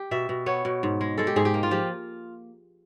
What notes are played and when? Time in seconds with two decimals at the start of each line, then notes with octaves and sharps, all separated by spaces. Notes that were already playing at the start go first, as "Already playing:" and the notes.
Already playing: G4
0.11 B2 E5
0.29 B2
0.46 B3 C#5
0.65 B2
0.83 G#2
1.01 G#3
1.18 G#3 A4
1.27 G4
1.36 G#2 G#4
1.45 G4
1.54 A#3
1.63 F4
1.71 F3 G4